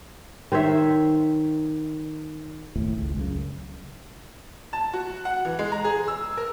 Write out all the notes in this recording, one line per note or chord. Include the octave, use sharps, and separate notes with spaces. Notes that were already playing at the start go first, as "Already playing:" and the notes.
D#3 C5 C#5 E5
F#1 D#2 A2
C#2
C#2 F#2 C#3
A5
F#4
F#5
E3
G#3
A#5
G#4
E6
A#4